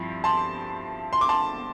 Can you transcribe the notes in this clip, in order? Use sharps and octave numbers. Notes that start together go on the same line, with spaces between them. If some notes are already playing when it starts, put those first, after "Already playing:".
Already playing: G2 F3 C4 E4
A5 C6
C6
D6
A5 C6